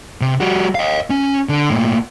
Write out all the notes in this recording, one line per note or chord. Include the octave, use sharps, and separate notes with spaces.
C3
G3 F#4
D#5 F5
C#4
D3
A2 A#3